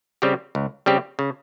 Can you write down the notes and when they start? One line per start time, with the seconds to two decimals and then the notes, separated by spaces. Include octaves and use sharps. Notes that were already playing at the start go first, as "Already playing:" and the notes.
0.22 C#3 G3 C4 G4
0.55 C#2
0.86 C#3 G3 C4 G4
1.19 C#3